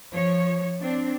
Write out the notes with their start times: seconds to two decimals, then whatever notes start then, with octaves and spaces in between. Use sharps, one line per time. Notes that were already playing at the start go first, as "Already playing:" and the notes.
0.13 F3 C#5
0.81 C4 D4